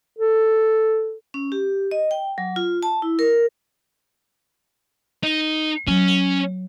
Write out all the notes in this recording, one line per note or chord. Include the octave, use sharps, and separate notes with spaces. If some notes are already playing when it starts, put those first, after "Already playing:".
A4
C#4
G4
D#5
G5
F#3
F4
A5
E4
A#4
D#4
F#3 C#4